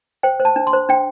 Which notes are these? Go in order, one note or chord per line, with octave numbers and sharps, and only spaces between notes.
C5 G5
C5
A5
D4
C6
C5
D4 G5